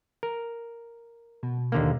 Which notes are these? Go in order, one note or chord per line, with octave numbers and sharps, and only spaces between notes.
A#4
B2
D#2 D3 A#3